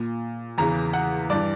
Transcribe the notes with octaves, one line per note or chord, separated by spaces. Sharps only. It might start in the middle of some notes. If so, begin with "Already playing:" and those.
Already playing: A#2
E2 C#3 E3 A#5
F#5
G2 E3 D5